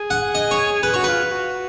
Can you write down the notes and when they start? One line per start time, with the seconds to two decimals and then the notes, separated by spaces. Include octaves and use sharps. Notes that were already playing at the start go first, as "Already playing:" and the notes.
Already playing: G#4
0.10 F#5
0.35 D#5
0.51 C#5
0.83 G#4 B4
0.94 F#4 C#5
1.04 F4 B4
1.31 F#4